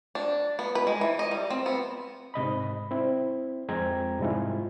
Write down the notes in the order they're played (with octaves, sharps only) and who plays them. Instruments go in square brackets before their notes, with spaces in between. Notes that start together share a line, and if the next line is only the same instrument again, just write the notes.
[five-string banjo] D4
B3
B4
G#3
E3
D#5
G3
C4
B3
[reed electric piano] G#2 C3 D#5 B5
C4 E4
F2 G#3 C4 G5 A#5 G#6
G#2 C3 G3 G#3 E4 F4